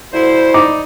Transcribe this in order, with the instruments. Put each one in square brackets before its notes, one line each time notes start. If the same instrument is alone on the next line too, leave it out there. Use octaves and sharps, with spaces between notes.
[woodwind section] D2 E4 C5
[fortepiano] D#4 D5 D6